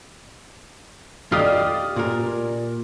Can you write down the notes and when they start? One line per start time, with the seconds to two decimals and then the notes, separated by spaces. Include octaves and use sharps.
1.32 F4 G4 D5 D#5 F5 G5 D#6 F6
1.96 A#2 A#4